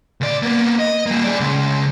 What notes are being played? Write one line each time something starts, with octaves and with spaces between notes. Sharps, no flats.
C#2 D5
A#3 B3
D#5
G3 A#3
G#4 D5
C#3 G#3